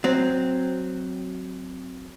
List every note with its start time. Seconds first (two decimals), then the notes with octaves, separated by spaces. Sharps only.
0.04 F#3 C4